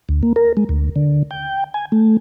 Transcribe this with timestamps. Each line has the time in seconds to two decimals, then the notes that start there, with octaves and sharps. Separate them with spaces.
0.09 D2
0.23 A#3
0.36 A#4
0.57 G#3
0.69 D2
0.96 D3
1.31 G5
1.74 G#5
1.92 A3